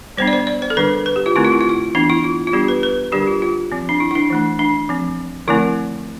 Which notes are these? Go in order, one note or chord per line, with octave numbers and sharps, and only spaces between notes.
G3 B3 D4 C5
D5
C5
D5
C5
A4
D3 G3 D4 B4
B4
G4
F4
D3 A3 C4 E4
F4
E4
F4
E4
E3 B3 D4
E4
F4
F4
G3 B3 D4 G4
B4
B4
D3 G3 D4 G4
F4
F4
F3 C4
D4
E4
E4
D4
E3 A3 D4
D4
F3 C4
D3 F3 A3 C4 E4